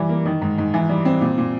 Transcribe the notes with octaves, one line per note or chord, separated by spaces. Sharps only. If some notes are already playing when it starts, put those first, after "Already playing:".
Already playing: E3 G3
A#3
D#3
G#2
G#2
E3
G3
C4
A#2
A#2